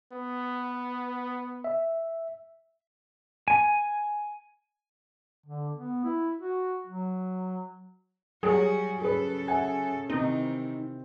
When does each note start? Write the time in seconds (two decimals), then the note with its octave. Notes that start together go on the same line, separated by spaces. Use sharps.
0.12 B3
1.64 E5
3.48 G#5
5.46 D3
5.75 B3
6.04 E4
6.41 F#4
6.86 F#3
8.43 F#3 G3 F#4 G#4 G#5
9.02 C#3 G#4 A4 B4
9.48 E5 F#5 G#5
10.10 C3 D#3 E3 C4 D#4